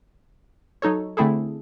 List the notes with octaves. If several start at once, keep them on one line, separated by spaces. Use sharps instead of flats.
F#3 D#4 A4 C#5
D3 A3 C4 E4 G#4 A4